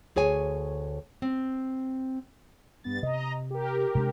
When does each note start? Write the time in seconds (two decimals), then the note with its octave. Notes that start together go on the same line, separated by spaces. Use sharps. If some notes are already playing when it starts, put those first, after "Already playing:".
0.16 D2 G#4 C#5 G#5
1.22 C4
2.84 G2 B3 A6
3.03 C3 D#5 A#5
3.50 G4 A#4
3.95 C3 G#3 D4